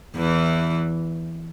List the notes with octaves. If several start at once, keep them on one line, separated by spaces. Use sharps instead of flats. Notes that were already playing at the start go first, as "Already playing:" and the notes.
E2 E3